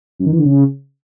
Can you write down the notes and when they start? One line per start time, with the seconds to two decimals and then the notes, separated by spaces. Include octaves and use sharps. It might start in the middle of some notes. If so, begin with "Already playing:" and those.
0.19 F#2
0.26 D#3
0.32 E3
0.39 D3
0.45 C#3